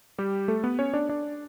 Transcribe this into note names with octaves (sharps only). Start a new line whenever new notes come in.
G3 G4
A3 A4
B3 B4
C#4 C#5
D4 D5
D4 D5